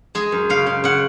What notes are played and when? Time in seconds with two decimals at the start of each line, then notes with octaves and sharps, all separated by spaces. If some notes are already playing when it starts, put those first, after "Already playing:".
0.15 G#3 G#4
0.32 F#2
0.50 C#3 F5
0.66 C#3
0.84 C#3 F#5